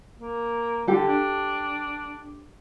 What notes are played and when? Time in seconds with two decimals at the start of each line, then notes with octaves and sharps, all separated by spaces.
0.19 A#3
0.87 D3 G4 A4
1.08 D4